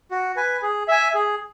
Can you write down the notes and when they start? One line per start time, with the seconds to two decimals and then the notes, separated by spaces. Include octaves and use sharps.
0.11 F#4
0.36 B4 G#5
0.62 G#4
0.88 E5 G#5
1.14 G#4